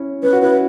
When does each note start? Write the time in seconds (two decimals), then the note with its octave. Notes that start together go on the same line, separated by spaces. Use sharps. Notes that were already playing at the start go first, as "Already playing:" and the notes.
Already playing: C#4 E4
0.23 C#4 B4
0.33 F#4
0.42 E4 B4